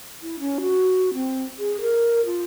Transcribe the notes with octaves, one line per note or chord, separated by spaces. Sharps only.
E4
C#4
F#4
C4
G#4
A#4
F4